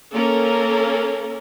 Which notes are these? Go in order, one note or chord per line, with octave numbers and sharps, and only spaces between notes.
A#3 C#4 A4 A#4